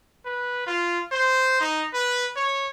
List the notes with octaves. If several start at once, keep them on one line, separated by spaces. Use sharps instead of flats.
B4
F4
C5
D#4
B4
C#5